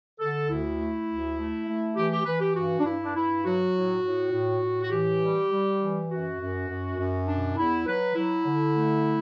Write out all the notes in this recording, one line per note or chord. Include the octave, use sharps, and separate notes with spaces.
D3 A4
D2 E4
A3
D2
A3
A3
E3 G4
G4
E3 B4
G4
G2 F#4
D4
G2 E4
D4
G2 E4
F#3 F#4
A2
A2
A2
A2
F#4
E3 G4
G3
G3
E3
F#2 F#4
F#2
F#2
F#2
B2 D4
E2 E4
F#3 B4
F#3 E4
D3
A3